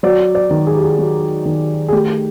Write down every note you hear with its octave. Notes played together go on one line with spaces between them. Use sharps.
F#3 D5
D5
D#3
G#4
G4
G#4
F#3
D#3
G#4
A3 G4